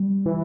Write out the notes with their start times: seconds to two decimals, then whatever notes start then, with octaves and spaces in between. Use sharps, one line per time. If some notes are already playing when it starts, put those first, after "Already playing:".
Already playing: G3
0.26 E3